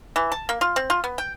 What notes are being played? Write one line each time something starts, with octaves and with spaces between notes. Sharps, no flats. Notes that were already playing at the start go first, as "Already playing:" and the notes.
E3
A5
A#3
F4
C4
F4
B3
G5